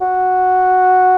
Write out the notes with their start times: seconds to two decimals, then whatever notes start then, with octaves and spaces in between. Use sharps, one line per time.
0.01 F#4